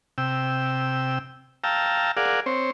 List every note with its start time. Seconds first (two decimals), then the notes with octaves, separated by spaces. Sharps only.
0.18 C3 G5 E6
1.64 F5 G5 A5 A#5 E6
2.17 G#4 A#4 D5 F5 F#5
2.46 C4 C5 C#5